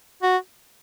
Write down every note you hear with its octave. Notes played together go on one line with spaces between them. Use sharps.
F#4